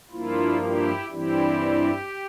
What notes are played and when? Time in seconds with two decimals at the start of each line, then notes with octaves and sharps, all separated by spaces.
0.10 G2 F3 A#3 E4 F4
0.60 E4 G4
1.10 G2 E3 G3 C4 E4 G4